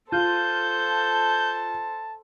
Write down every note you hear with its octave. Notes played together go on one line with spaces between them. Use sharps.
F4 A4 C5 A5 G6